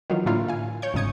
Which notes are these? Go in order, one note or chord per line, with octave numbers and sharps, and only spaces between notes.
D#3 E3 F#3 F4
A2 D3 A#3 E4 F4
F5 G#5
C#5 C#6 G6
G1 G#2 C#3 D#6 G#6 C#7